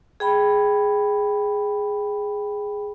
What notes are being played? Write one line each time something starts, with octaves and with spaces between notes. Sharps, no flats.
G#4 G5 B5